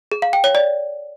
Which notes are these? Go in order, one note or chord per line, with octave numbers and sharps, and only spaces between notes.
G#4
F5
G5
C#5
D5